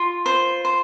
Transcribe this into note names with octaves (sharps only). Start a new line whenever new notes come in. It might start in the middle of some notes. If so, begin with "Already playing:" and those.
Already playing: F4
C5
C5